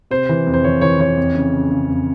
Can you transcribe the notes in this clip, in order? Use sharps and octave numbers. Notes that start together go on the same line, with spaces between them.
C3 C5
E3
F2
C5
E3 C#5
E3 C#5
E3 C#5
F2
C#3
C#3
C#3
F2